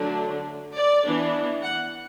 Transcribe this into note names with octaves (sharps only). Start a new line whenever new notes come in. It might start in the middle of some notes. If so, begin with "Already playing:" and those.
Already playing: D3 F#3 A3 D4
D5
E3 B3 D4
F#5